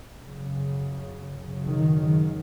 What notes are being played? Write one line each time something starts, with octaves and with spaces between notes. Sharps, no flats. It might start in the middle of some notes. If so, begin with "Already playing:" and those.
F#2 C#3
F#2 C#3
D#3
D#3